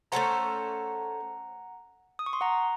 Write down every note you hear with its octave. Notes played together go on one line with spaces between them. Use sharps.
A3 C#4 A4 C5 F#5 A#5
D#6
C#6
C6
F#5 A#5